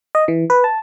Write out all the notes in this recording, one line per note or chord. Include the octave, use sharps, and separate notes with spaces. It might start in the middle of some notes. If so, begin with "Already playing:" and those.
D#5
E3
B4
A5